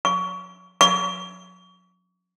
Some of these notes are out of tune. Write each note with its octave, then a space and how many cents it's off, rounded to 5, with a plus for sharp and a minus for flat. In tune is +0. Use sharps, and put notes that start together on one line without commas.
C#6 +25
C#6 +35